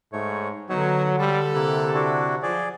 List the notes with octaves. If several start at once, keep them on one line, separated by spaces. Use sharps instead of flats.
G#2 A3 C#5
D3 F#3 B3 D#4 F#4 C#5
G3 G4 A4 B4
C3 A#3 E4 F#6
D4 E4 F#4
F3 F#3 G#4 D5